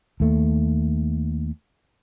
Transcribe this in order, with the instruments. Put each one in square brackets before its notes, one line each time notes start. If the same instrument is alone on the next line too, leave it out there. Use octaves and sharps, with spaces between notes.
[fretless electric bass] D#2 A3